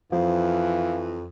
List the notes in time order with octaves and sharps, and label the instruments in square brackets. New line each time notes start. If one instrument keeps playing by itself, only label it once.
[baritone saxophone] F2 [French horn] E3 [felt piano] F3 [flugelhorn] F5